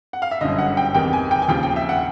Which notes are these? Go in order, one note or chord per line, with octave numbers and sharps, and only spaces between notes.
F#5
F5
E5
G1 F#2 D3 D#5
F#5
G5
E2 C3 D#3 G5
G#5
G5
G#5
D#2 C#3 F3 G5
G5
E5
F#5